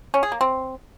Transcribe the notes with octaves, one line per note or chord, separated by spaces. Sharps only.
C#4
G#4
A#3
C4